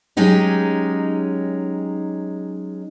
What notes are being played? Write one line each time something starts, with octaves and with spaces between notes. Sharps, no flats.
F#3 G#3 C#4 D#4 G4